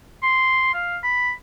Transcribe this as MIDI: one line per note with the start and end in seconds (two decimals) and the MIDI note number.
0.23 0.74 84
0.74 0.98 77
1.03 1.32 83